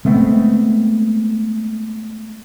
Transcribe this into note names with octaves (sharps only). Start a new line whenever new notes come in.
G#3 A3 B3 C4